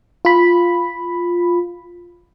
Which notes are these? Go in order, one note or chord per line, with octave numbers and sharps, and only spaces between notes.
F4 B5